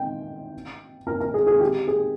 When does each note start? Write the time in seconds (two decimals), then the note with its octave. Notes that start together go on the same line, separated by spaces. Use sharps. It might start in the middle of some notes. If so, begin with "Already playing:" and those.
Already playing: G5
1.07 A#4
1.20 A#4
1.34 G#4
1.47 G#4
1.60 G4
1.87 G#4